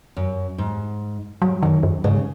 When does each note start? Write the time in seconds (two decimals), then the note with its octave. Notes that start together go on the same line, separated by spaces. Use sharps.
0.16 F#2
0.58 G#2
1.42 G#2 F#3
1.63 F#2 D#3
1.83 F#2
2.04 G#2 C#3